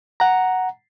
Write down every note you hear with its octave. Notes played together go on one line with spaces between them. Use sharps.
F#5 A#5